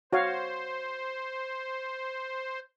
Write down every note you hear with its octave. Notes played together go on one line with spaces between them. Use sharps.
F#4 C5 C#5 F5